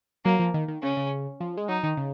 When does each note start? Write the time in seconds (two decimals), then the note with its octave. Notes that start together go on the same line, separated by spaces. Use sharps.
0.25 F#3 A#3
0.39 F3
0.54 D#3
0.68 D#3
0.82 C#3 C#4
0.97 C#3
1.40 F3
1.57 G#3
1.68 F#3 D#4
1.83 D#3
1.97 C#3